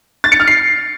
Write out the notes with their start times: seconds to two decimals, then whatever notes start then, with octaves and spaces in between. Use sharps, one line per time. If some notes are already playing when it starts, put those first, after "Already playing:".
0.24 A6
0.32 C#7
0.40 F6
0.47 C7